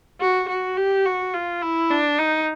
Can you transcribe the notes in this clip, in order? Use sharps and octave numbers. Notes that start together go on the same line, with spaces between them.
F#4
F#4
G4
F#4
F4
E4
D4
D#4